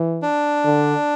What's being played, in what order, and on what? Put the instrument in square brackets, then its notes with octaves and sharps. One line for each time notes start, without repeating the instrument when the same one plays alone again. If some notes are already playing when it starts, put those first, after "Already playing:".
Already playing: [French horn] E3
[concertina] D4
[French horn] D3